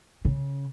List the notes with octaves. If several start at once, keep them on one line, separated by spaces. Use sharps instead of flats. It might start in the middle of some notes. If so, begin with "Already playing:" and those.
C#3